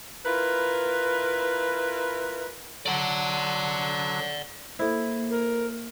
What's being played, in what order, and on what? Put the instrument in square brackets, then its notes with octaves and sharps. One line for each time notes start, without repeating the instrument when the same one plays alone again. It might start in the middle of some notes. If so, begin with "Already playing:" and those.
[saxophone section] E4 F4 A#4 B4
[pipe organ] D3 F#3 [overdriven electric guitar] D5 F#5
[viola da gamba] A#3 [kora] E4 [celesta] A4 C5
[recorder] A#4